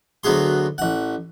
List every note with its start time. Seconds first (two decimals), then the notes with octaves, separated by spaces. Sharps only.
0.24 D2 F#3 B3 G#4 C6
0.78 A1 F#5